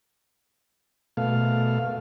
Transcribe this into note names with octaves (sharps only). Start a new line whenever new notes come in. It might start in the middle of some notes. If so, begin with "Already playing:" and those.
B2 A3 F5